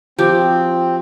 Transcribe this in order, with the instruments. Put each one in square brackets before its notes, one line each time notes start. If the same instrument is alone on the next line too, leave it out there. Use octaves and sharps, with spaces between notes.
[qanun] F3 [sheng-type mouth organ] C4 [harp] G4